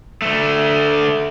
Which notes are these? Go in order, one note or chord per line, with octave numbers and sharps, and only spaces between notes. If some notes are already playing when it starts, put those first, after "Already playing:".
D3 A3